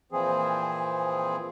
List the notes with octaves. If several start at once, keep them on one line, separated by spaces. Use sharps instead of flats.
A#2 E3 F3 C4 G#4